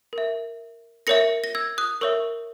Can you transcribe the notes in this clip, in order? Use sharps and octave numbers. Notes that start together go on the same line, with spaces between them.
A#4 E5
A#4 C#5 E5 A#6 C#7
A#6
E6 G#6
D#6 F#6
A#4 C#5 E5 C#6 E6